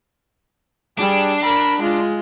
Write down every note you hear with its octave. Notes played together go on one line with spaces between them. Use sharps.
G3 D4 G#4
A#4 B5
G#3 F4